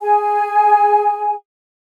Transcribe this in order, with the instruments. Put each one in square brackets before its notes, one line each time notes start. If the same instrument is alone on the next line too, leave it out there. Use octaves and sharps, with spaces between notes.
[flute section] G#4 G#5